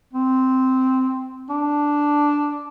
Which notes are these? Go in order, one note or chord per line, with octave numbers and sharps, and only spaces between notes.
C4
D4